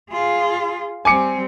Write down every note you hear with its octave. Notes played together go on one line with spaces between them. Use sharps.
F4 G#4
G3 C4 G#5 D6 C#7